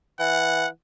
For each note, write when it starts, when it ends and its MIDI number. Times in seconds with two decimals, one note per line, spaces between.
0.20 0.66 52
0.20 0.68 78